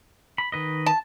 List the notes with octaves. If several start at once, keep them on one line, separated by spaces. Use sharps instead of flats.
B5
D#3 B4 D#5
A5